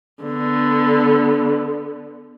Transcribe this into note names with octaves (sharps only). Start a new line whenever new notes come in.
D3 B3